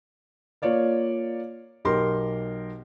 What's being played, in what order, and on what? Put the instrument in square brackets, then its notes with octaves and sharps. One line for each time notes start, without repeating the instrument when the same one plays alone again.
[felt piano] A#3 F4 C#5 D5 F5
B1 G4 A#4 C6